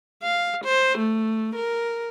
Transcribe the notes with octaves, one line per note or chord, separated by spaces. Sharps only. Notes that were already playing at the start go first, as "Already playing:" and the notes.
F5
C5
A3
A#4